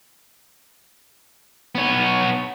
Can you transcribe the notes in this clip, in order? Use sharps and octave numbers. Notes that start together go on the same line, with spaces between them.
B3 C#5